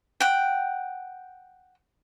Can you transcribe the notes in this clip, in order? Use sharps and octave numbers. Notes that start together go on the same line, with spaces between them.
F#5 G5